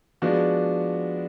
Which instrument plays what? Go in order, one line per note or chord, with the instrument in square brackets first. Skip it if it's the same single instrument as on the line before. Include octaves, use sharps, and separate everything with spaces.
[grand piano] F3 G#3 B3 D4 F#4